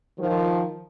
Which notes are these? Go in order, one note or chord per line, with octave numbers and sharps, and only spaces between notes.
D#3 F3